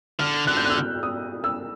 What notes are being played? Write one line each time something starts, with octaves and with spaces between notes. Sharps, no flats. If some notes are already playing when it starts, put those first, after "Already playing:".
D3 F6
D3 F#6
G6
E6 F#6
F6
D#6
E6